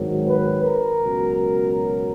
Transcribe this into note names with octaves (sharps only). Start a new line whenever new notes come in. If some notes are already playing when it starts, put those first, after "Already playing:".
Already playing: G#1 G#2 D#3 F#3
B4
A#4
C#2 B2 F#3